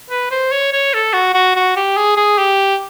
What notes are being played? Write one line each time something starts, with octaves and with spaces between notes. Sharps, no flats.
B4
C5
C#5
C#5
A4
F#4
F#4
F#4
G4
G#4
G#4
G4